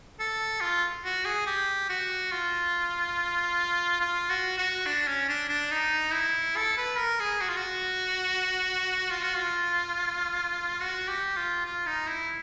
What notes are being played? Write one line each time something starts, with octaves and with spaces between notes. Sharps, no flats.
A4
F4
F#4
G#4
G4
F#4
F4
F4
F#4
F#4
D4
C#4
D4
D4
D#4
E4
A4
B4
A#4
G#4
F#4
F4
F#4
F4
F#4
F4
F#4
G4
F4
F4
D#4
E4